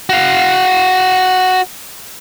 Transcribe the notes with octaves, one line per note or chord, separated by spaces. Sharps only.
F#4 F5